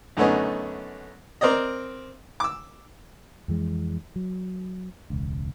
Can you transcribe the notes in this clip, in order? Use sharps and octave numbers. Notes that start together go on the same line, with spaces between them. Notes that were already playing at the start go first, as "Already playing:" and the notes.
F#2 D3 A3 B3 C#4 D#4
C4 A#4 C5 D5 D#5
D6 E6
F2 E3 G#3
F#3
E1 C#2